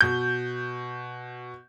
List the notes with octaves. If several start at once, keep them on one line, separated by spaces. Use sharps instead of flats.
B2 G6